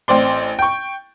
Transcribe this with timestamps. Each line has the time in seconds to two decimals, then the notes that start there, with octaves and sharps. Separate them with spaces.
0.08 A1 C4 D5 C6
0.59 G5 C#6